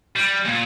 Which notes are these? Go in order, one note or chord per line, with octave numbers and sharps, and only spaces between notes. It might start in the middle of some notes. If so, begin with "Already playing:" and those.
G3
A#2